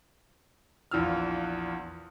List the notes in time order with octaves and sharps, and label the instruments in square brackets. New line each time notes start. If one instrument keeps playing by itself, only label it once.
[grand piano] A#1 E2 E3 F4 E6 F6